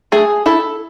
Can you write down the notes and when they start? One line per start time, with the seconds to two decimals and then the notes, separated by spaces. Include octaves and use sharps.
0.12 A3 G#4
0.46 E4 A4